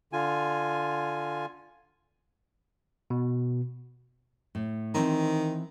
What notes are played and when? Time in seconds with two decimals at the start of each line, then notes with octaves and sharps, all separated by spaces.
0.13 D3 F4 G#5
3.10 B2
4.55 A2
4.94 D#3 E3 C4 C5